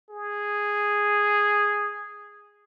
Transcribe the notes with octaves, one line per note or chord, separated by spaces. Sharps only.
G#4